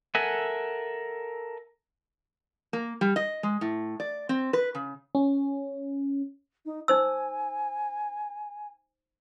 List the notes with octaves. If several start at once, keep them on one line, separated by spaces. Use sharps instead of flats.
A4 A#4 E5 F#5 G#5
A#3
G3
D#5
G#3
A2
D5
C4
B4
C#3
C#4
D#4
D#4 C5 G#5 E6